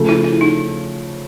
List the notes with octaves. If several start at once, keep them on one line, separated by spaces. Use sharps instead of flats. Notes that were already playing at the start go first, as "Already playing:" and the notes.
Already playing: C#3 F3 A3
E4
E4
D#4